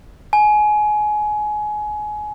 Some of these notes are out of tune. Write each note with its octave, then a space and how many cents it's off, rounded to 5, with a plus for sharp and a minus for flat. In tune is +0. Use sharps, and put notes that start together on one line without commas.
G#5 +25